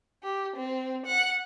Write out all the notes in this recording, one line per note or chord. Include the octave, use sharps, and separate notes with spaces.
G4
C4
F#5